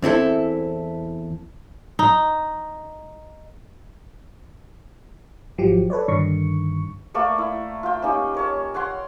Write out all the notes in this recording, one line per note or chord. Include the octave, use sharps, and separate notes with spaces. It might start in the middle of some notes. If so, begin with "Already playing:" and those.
E2 C4 E4 A4
D#4
G#1 F3 F#3 G4
A4 B4 C#5 D5
G2 D3 D#3 C#6
A3 A#3 D5 C#6
E4
F4 G5
A#3 C#4 D#4 G4
A#4 C#5 A5
C#5 F#5 G5 C6